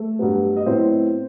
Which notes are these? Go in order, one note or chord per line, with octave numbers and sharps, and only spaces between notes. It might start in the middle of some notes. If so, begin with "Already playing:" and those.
Already playing: A3 A4
G2 F#3 B3
D#5
A2 F#3 B3 C4 C5